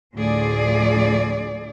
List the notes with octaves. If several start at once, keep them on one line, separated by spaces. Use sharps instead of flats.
D2 A2 F3 A3 G#4 D5